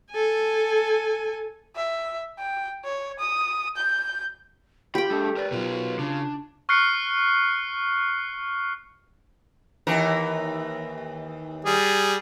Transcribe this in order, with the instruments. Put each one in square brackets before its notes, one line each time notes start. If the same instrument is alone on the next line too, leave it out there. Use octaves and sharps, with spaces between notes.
[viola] A4 G#5
[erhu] E5
G5
C#5
D#6
G6
[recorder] F4 [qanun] G4 G5 [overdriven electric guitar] B5
[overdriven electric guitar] G#3 A4 [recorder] D4
[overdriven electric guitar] A#4 B4 [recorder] D5
[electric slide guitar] B2 F#3 [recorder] F4
[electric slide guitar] C#3 [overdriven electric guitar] D4
[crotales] C#6 F6 F#6 C7 C#7
[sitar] D#2 E3 A#4
[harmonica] G3 G#4